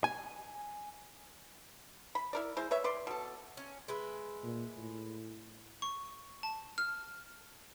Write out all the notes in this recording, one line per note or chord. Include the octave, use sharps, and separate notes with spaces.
G#5
B5
E4 A#4 D5
G#3 E4 C5
B4 C#5 E5
B4 D5 C6
B2 A4
C#4
G#3 B4 E5
A#2
A2
C#6
A5
F6